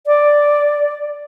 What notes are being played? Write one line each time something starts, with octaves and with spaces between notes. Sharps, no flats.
D5